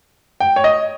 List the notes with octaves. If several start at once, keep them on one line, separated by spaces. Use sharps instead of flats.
G5
C#5
D#5